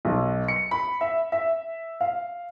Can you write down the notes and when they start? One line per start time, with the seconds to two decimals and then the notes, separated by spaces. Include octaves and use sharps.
0.05 B1
0.48 C#7
0.71 B5
1.01 E5
1.32 E5
2.01 F5